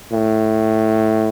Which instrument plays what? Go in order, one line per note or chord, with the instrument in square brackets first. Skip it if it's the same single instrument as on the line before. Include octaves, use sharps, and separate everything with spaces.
[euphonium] A2